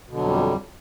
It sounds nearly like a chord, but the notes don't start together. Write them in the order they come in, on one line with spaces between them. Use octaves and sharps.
B2 D3 F#3 F2 G3